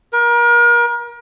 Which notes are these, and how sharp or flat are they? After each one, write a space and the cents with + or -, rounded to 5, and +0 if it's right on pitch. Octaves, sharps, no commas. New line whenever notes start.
A#4 +35